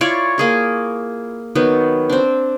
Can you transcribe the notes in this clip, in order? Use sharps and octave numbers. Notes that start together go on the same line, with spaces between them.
E4 F4 C#5 D5
A#3 G#4 A#4
D#3 F#3 B3
C4 D4